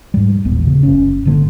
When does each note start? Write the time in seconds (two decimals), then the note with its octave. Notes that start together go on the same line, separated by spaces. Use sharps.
0.14 G#2 G3
0.45 E1 A#1 E2 B3
0.67 C#3
0.83 F#1 C#4
1.26 G1 A2 D3 A#3